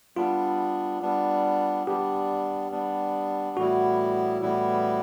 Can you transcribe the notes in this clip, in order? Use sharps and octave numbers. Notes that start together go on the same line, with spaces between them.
G3 B3 D4 F4
G3 B3 D4
G3 B3 D4 G4
G3 B3 D4
A2 E3 G3 B3 E4 F#4
A2 E3 G3 B3 E4